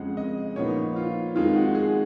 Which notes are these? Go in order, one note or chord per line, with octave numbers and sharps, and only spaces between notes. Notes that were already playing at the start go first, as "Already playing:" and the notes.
Already playing: F2 C#3 F3 G#3 F#5
D#5
A#2 F3 B3 D#4 C#5
F4
F2 D#3 G#3 D#4 F4
F#4
G#4